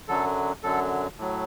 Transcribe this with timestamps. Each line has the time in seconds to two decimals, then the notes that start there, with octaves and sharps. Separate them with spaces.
0.08 F#2 D3 F#3 A4
0.63 F#2 D3 F#3 A4
1.18 A2 F#3